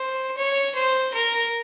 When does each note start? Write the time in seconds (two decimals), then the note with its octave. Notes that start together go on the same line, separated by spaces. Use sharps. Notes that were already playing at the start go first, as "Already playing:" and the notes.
Already playing: C5
0.37 C#5
0.75 C5
1.14 A#4